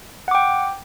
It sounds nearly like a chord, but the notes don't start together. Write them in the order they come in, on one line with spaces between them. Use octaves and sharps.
F#5 D6 G5